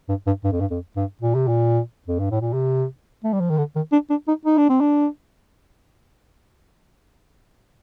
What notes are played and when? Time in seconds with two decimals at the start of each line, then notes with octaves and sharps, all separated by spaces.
0.09 G2
0.26 G2
0.44 G2
0.52 F2
0.60 G2
0.71 F2
0.96 G2
1.22 A#2
1.35 C3
1.47 A#2
2.07 F2
2.19 G2
2.31 A2
2.41 A#2
2.53 C3
3.24 A3
3.33 G3
3.40 F3
3.50 D#3
3.58 D3
3.76 D#3
3.92 D4
4.10 D4
4.28 D#4
4.45 D#4
4.57 D4
4.69 C4
4.80 D4